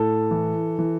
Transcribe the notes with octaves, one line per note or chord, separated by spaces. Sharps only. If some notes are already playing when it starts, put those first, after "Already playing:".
Already playing: A2 A4
E3
E3